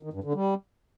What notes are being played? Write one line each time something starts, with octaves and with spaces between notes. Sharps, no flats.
D#3
G2
D3
G3